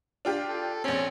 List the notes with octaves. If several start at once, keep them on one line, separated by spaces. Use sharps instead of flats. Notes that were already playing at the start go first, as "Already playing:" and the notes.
D4 F4 G4
A4
A#1 C4 C#4